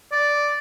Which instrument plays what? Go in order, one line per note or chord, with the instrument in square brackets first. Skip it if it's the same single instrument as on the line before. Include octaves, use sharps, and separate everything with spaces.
[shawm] D5